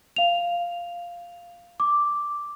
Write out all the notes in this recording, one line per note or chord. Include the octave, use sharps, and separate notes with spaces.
F5 F7
D6